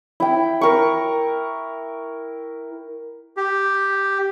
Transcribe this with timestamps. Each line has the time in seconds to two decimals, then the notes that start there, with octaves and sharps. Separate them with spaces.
0.20 E4 G5
0.61 A#4 C#6
3.37 G4